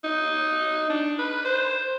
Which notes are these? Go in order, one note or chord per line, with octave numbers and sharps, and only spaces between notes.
D#4
D4
B4
C5